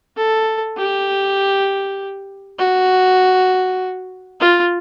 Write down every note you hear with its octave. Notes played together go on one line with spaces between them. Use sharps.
A4
G4
F#4
F4